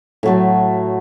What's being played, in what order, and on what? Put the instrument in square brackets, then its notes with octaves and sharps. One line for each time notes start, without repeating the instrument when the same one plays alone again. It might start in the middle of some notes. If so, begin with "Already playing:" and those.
[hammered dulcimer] A2 F#3 A3